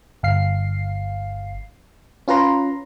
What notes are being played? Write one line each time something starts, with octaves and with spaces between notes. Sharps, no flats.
G1 F5 C7
C#4 F4 B4 A#5 C6